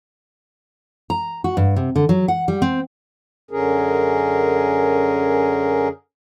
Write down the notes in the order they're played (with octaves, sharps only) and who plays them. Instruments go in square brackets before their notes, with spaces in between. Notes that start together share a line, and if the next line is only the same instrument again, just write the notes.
[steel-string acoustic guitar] A#5
F#4
G2
C3
D3
F#3
F#5
G3
C4
[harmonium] F#2 D3 C#4 G#4 A#4